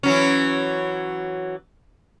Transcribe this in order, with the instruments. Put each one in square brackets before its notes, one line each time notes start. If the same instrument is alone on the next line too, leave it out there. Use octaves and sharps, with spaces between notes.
[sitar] E3 F#3 C#4